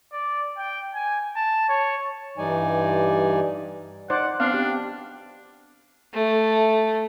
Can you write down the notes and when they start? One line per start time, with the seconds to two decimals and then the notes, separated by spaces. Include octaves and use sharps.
0.12 D5
0.57 G5
0.94 G#5
1.36 A5
1.69 C#5
2.38 G2 E3 G3 D#4 D5 G#5
4.10 D#4 C5 D5 F#5
4.40 B3 C4 D4 F5
4.54 G4
6.14 A3